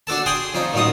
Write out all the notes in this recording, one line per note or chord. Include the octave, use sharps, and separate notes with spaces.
D4 F#4 A4 A5
G#4 G5 G#5 C6
F3 C#4 D#4
A1 F#2 D#3 D#4 F4 D#6